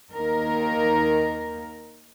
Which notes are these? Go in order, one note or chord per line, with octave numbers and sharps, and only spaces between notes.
D#2 D#3 A#3 D#4 A#4